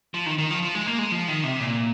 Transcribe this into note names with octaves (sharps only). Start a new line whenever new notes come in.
F3
D#3
D#3
F3
F3
G#3
A#3
G#3
F3
D#3
C3
A#2